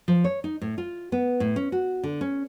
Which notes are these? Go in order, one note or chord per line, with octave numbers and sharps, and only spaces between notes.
F3
C#5
D#4
A2
F4
B3
A2
C#4
F#4
D3
C#4